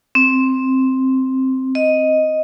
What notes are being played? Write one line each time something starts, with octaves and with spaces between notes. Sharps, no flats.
C4
D#5